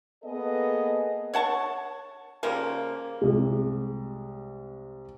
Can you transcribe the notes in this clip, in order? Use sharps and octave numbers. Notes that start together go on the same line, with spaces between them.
A#3 B3 G#4 A4 D#5
C#5 F#5 A5 C#6
C#3 F3 G3 A#3
C2 G#3